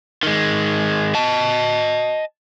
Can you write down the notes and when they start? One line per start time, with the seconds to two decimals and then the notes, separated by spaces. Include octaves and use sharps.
0.23 D#3 G#3
1.14 D#5 A5